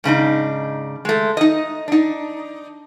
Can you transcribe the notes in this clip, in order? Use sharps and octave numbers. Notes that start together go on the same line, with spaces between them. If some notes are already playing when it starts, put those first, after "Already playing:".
G#2 C#3 D4 D#4
G#3 A3
D#4 D#5
D4 D#4